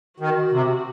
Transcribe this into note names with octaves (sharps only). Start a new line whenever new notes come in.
D#3 F#4
C3